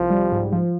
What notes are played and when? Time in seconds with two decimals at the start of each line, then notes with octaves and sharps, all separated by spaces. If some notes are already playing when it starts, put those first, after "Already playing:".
Already playing: C2 F3
0.10 G3
0.32 G#2
0.52 F3